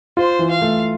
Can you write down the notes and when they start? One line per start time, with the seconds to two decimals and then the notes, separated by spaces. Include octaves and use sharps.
0.17 F4 C5
0.39 E3
0.51 F5
0.62 A3